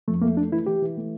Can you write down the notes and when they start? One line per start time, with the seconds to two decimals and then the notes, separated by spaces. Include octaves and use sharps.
0.08 F2 A3
0.22 A3 A#3
0.37 A3 D4
0.52 E3 E4
0.67 E3 G4
0.82 E3
0.97 A3